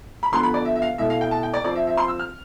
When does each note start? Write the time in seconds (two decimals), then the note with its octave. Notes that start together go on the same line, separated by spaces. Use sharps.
0.23 B5
0.32 D3 F3 B3 C6
0.43 B5
0.54 D5
0.65 E5
0.76 E5
0.82 F5
0.98 B2 A3 E4 E5
1.10 F5
1.21 G5
1.31 A5
1.43 G5
1.54 D5
1.64 F3 C4 F4 D5
1.75 E5
1.87 E5
1.97 C6
2.08 E6
2.19 F6